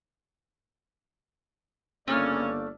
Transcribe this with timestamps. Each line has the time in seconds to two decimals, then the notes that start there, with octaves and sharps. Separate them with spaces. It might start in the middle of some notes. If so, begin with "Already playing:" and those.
2.08 G1 C#3 A3 A#3 C#4 D5 F6